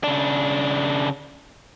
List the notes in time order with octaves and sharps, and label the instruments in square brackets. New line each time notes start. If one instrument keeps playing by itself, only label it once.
[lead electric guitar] C#3 D4